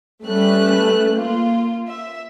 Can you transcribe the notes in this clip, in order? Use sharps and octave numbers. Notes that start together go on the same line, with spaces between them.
G3 A3 C#4 B4 F#6
A#3 F4
E5